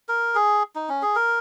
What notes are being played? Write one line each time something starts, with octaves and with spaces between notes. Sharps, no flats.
A#4
G#4
D#4
C#4
G#4
A#4